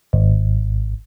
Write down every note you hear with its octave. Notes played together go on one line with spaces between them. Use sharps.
G#1